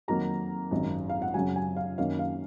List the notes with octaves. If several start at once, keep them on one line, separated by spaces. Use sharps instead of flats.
F2 D#3 F#3 A#3 A#5
G#1 F#2 D#3
F5
F#5
F#2 C#3 F#3 G#5
G#5
F5
F#2 D#3 A#3 C#4 F5
F5